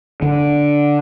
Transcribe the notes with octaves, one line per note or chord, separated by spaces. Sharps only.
D3